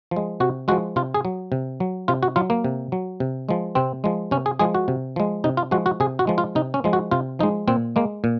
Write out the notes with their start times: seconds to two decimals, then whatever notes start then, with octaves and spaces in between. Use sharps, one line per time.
0.11 F3
0.16 G#3
0.40 C3 F#4
0.68 F3 G#3 F#4
0.96 C3 F4
1.14 G#4
1.25 F#3
1.52 C3
1.80 F#3
2.08 C3 F4
2.23 F#4
2.36 F#3 F4
2.50 A#3
2.64 C3
2.92 F#3
3.20 C3
3.49 F3 G#3
3.75 C3 C4
4.04 F3 G#3
4.31 C3 C#4
4.46 G#4
4.59 F3 G#3 G#4
4.75 F#4
4.88 C3
5.16 F3 G#3
5.44 C3 D#4
5.57 F4
5.71 F3 G#3 F#4
5.86 F#4
6.00 C3 G#4
6.19 F#4
6.27 F3 G#3
6.38 F4
6.55 C3 D#4
6.74 C#4
6.84 F3 G#3
6.93 F#4
7.11 C3 F4
7.39 F3 G#3 D#4
7.67 A#2 C4
7.96 G#3 A#3
8.24 A#2